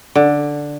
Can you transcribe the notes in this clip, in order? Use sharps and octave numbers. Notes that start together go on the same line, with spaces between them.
D3